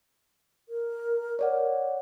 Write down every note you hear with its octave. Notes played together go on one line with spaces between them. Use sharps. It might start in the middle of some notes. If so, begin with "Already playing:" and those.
A#4
C#5 D5 F#5